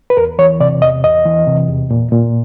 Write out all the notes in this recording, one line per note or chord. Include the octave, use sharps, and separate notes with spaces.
B4
E2 A#4
E3 C#5
C3 D5
E2 D#5
E2 D#5
E3
C3
E2
A#2
A#2